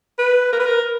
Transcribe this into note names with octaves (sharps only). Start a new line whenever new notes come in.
B4
A#4
B4
A#4